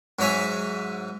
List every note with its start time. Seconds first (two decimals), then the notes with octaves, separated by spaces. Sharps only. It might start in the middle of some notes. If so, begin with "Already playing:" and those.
0.19 G#2 F#3 C#5 E5 G#5